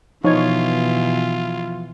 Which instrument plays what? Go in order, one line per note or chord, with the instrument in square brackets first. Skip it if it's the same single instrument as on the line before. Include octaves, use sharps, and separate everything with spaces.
[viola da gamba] B2 E3 [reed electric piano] F3 G#6 [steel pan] D#4 C#5 [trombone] F4